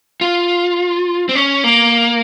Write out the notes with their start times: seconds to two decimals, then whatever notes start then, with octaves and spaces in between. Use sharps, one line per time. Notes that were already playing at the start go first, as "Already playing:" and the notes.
0.21 F4
1.29 C4
1.35 C#4
1.64 A#3